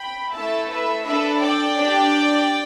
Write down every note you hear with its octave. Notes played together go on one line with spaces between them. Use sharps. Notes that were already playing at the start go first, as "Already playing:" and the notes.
Already playing: G5 B5
A3 E4 A4 E5 A5
B4 E5
D4 A4 B4 E5
D5 G5
D4 G4